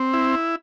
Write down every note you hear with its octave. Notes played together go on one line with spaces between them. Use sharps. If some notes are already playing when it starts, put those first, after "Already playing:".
Already playing: C4
E4